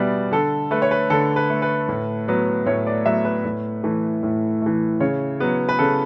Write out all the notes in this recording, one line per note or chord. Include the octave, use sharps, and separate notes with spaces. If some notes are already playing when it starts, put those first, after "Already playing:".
Already playing: B2 G3 B3 D5 E5
D3 A4
A3 B4
C#5
B4
D3 A4
B4
A3
B4
A2
F#3 B3
A2 C#5
D5
F#3 B3 E5
B4
A2
E3 A3
A2
E3 A3
C#3 C#5
F#3 B3
B4
C#3 A4